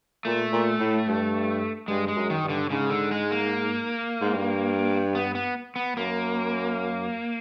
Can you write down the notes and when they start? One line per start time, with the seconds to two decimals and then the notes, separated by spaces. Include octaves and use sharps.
0.25 A#2 A3
0.53 A#2
0.80 A2
1.07 G2
1.88 G2 G#3
2.08 G#3
2.15 F#2
2.30 D#3
2.43 G2
2.49 D3
2.70 G#2 C#3
2.90 D3
3.11 G#3
3.31 A#3
4.21 G#2
4.33 G2
5.15 B3
5.35 B3
5.76 B3
5.96 F#2 A#3